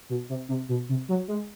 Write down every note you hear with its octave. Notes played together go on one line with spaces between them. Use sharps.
B2
C3
C3
B2
C3
F#3
G#3